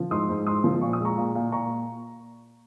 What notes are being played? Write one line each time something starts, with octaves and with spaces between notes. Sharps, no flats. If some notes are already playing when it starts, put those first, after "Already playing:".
Already playing: F3
G#2 C6 D#6
G#2
G#3 C6 D#6
F3
A#2 C#6
D#6
G#3 A#5 C#6
A#2
A#2
A#2 A#5 C#6